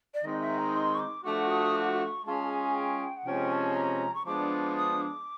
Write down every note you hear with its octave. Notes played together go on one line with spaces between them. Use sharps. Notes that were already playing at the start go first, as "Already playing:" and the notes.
D5
D#3 G#3 C4 D#4 D#5
E5
A#5
C6
C#6
D6
F3 A3 D4 F#4 D6
D#6
D6
C#6
G#3 C#4 F4 G#4 A5
G#5
G5
F#5
C3 F3 G#3 C#4 G5
A5
A#5
C#6
F3 G#3 B3 D4 D6
D#6
D6